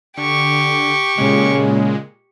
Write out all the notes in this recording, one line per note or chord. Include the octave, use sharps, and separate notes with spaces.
D3 G4 C#6
A#2 C#3 G#3